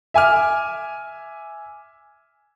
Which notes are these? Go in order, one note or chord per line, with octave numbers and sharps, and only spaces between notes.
E5 G#5 D6 F6